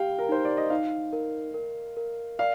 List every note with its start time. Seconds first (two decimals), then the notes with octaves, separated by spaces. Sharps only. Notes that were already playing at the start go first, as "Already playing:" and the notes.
Already playing: G4 F5 G5
0.19 A#4
0.29 D#4 C5
0.45 D5
0.57 D#5
0.70 D#4 F5
1.13 A#4
1.54 A#4
1.97 A#4
2.39 D5 F5